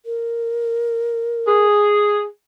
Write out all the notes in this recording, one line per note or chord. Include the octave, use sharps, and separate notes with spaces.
A#4
G#4